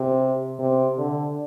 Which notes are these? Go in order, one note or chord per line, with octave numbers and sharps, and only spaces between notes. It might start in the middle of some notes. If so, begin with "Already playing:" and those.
Already playing: C3
C3
D3